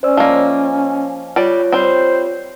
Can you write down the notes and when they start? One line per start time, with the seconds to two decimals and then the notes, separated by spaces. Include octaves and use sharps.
0.03 C#4 C5 D5 E6
0.17 F3 A#3 D#5
1.36 G3 F4 C#5 D5
1.72 G3 C4 C5